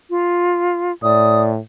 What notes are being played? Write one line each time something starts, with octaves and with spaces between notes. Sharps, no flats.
F4
A2 D5 D#6